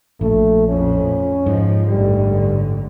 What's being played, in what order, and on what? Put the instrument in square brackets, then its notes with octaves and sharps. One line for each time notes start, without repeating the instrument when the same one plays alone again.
[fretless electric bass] A#1 [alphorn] A3
[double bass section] F2 A2 [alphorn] C#4
[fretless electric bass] G#2 [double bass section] F3
[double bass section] A1 F#2 D3 [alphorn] G3